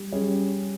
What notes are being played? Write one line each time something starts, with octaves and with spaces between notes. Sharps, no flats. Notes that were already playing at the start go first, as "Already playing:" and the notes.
Already playing: G3
G3 C#4 G#4